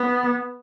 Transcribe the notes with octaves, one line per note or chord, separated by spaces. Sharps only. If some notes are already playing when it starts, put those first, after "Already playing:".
Already playing: B3